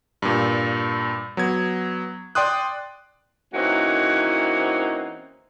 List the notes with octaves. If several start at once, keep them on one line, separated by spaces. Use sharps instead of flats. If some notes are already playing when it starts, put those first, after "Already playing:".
G2 A#2
F#3 B3 G#6
D5 G5 C6 D#6 F#6
E3 A#3 C4 C#4 D#4 F#4